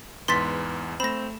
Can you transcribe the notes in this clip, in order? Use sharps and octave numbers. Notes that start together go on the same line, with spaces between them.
E2 G#2 B4 C6 A6 B6
A3 C4 B5 A#6 E7